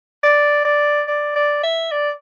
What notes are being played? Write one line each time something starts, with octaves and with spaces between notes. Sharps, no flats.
D5
D5
D5
D5
E5
D5